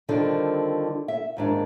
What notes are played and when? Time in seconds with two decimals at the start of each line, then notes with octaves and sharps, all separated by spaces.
0.09 D3 D#3 F3 G3 C4 D4
1.08 E5
1.37 D#2 G#2 D4